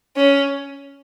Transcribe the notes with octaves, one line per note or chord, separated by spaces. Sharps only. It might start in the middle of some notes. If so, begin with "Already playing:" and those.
C#4